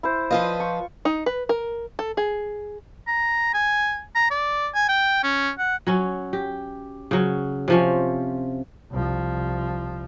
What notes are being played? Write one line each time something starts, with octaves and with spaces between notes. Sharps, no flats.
E4 C5
F3 F4 B4 D#5
C#6
D#4
B4
A#4
A4
G#4
A#5
G#5
A#5
D5
G#5
G5
C#4
F#5
F#3 C#4
G4
C#3 F#3
C3 F3 C#4
C2 F3